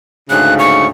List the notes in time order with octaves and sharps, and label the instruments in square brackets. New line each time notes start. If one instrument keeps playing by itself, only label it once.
[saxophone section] D2 G#2 C#3 [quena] F#6
[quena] C#6